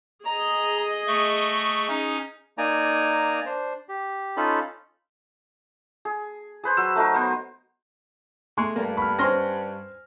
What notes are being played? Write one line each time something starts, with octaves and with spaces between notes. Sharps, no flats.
G#4 D#5 A#5
A3 C#6
C#4 D#4
A#3 D#4 D5 G#5 A#5
D4 C5
G4
C#4 D#4 F4 A4 B5
G#4
G#4 B4 C5
F#3 E6
A3 D#4 F#4 A#4
B3 C5
G#3 A3 C6
G2 A#3
B5 F6
C#4 C5 G#5 C6 F6 A#6